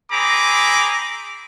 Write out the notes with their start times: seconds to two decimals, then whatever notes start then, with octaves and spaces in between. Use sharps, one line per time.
0.11 C4 G#4 A#5 B5 D6